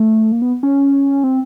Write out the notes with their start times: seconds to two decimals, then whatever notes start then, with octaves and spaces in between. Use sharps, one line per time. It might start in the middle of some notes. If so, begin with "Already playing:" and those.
Already playing: A3
0.32 A#3
0.42 B3
0.63 C#4
1.24 C4